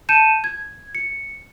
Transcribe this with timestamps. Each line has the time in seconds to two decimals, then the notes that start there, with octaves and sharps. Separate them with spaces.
0.09 A5 G6 C#7 D#7 E7
0.44 G#6
0.95 C#7